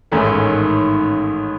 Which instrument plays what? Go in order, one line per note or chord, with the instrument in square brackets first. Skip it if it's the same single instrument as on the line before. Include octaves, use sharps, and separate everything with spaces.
[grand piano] A1 G#2 D#3 A3 C#4